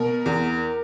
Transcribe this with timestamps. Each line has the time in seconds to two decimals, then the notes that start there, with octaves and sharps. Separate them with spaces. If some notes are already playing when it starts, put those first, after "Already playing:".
Already playing: B2 A#4
0.26 E2